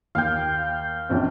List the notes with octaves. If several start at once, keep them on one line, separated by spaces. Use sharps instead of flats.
D#2 F5 G5
A#1 C4 C#4